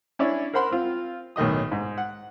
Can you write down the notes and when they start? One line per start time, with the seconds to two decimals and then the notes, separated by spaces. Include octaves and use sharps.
0.19 C#4 D4 E4 C#5 D5
0.54 A#4 C5 F#5 B5 C6
0.71 C4 F4
1.36 B1 A2 D#3 D#5 D#6
1.72 G#2
1.98 F#5